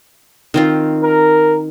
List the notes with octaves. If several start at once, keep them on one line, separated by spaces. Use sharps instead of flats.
D#3 C4 F4
A#4